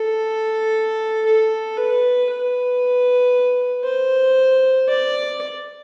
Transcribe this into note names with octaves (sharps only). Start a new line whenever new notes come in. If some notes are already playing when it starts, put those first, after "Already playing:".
Already playing: A4
A4
B4
B4
C5
D5